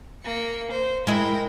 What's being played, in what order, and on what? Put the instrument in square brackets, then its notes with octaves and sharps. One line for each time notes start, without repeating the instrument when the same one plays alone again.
[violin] A#3 C#7
C5
[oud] G#3 E4 [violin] A#4 G5